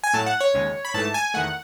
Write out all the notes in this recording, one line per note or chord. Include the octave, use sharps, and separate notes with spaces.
G#5
A2 F#3 A3 A5
F#5
C#5
D#2 C#3 G#3
B5
G#2 E3 A3 A5
G#5
E2 D#3 A3 F#5